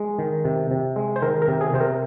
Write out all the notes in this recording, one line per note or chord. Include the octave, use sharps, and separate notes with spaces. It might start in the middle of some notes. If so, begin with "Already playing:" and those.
Already playing: G#3
D#3
C3
C3
G#3
C5
D#3 A#4
A#4
C3
G#4
C3 C5
A#4